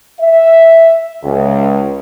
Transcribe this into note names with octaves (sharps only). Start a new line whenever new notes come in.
E5
C#2